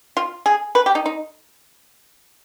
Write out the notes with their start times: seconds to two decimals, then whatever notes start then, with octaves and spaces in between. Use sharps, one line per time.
0.17 F4
0.46 G#4
0.75 B4
0.86 G4
0.95 D#4
1.06 D#4